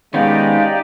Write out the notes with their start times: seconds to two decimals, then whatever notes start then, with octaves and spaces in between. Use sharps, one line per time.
0.14 D#3 G#3 B3 C#4 D#4 G4 D5 F5